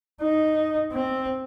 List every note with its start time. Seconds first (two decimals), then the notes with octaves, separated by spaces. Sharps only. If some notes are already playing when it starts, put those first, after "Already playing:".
0.22 D#4
0.92 C4